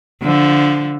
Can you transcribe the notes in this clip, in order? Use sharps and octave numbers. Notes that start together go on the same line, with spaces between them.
D3 F3